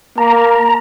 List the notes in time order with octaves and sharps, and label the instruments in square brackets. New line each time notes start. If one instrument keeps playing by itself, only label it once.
[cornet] A#3 [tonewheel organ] A#5